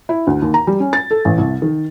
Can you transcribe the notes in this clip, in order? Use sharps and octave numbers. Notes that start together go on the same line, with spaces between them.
E4
D2
D#2
A#5
G3
C#4
A6
A4
A1
C2
D#3